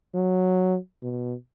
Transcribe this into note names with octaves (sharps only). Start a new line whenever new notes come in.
F#3
B2